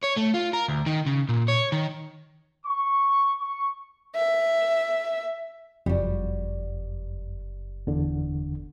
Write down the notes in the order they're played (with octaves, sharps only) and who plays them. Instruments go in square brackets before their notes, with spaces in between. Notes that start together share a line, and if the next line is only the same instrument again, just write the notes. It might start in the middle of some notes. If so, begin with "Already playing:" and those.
[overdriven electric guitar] C#5
A3
F4
A#4
D2
D#3
C#3
A#2
C#5
D#3
[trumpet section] C#6
C#6
[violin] E5
[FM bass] F#1 [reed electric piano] F2 [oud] G3 F#4
[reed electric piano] E2 D3